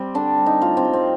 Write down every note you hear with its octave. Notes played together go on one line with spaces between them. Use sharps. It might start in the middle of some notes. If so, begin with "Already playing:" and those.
Already playing: G3 C4
D3 D4
G3
D#4
A2 F4
C4
G3
C4